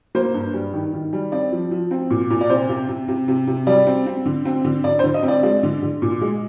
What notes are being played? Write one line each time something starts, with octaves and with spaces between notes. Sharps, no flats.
A#3 C5
G2
G3
D#3
D#3
G3
C4 D5
F3
F3
C4
A#2
A#2
D5
C3 C5
C3
C3
C3
C3
C3
G3 D5
C4
C4
D3
C4
D3
D3 D5
C5
D3
D#5
C4
D5
G#3 D5
D3
D3
A#2
G#3